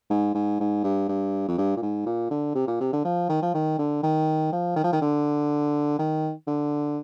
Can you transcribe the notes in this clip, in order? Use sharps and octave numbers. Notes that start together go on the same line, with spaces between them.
G#2
G#2
G#2
G2
G2
F2
G2
A#2
G#2
A#2
D3
C3
A#2
C3
D3
F3
D#3
F3
D#3
D3
D#3
F3
D#3
F3
D#3
D3
D#3
D3